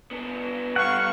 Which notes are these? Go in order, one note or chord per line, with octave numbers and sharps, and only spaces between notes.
B3 D4
G3 B3 F5 F#5 C#6